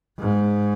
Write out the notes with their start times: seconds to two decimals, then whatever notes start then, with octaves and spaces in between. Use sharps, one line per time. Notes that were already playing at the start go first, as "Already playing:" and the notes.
0.19 G#2